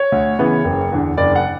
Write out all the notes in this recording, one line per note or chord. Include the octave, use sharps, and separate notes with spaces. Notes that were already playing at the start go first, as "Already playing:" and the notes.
Already playing: C#5
D2
C#3 E3 B3
F#1
E2 D3
F#1 D5
F#5